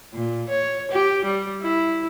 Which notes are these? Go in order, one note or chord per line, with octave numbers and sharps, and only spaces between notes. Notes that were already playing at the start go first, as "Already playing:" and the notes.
A#2
C#5
G4
G3
E4